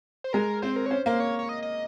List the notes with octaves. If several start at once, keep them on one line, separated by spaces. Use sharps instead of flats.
C5
G#3 A#4
C4 C5
A#4
C#5
C#4 C5
A#3 C5
C#5
C#5
D#5
D#5